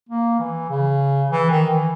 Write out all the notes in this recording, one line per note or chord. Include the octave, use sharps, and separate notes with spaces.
A#3
E3
C#3
E3
D#3
E3